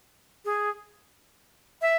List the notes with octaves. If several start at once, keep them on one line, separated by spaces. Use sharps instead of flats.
G#4
E5